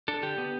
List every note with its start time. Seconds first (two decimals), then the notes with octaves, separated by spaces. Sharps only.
0.08 D4 A4
0.23 D3 G4
0.38 B3